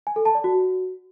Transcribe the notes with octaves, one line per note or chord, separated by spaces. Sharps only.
G#5
A4
A5
D5
F#4